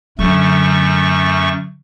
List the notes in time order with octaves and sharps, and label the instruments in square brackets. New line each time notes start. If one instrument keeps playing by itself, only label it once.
[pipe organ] F#2 A3 C#6 [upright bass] D3 F#3